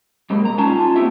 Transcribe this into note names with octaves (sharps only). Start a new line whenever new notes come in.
B2 G3 G#3 A#3
A#5
C#4 D#4 F4 G#5 A5
F4
A#3 C4 E4 G4 E5